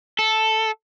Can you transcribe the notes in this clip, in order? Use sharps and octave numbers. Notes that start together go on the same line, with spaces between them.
A4